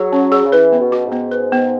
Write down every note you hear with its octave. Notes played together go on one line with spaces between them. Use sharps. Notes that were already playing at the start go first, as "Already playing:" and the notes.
Already playing: F#3 G#4
C#4
G#4
C#3
E3 B4
B3
B2
F#4
G#2
B3
B4
B3